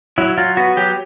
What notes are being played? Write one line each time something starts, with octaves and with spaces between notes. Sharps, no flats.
F#3 E4
F#3 F4
B3 F#4
F#3 G4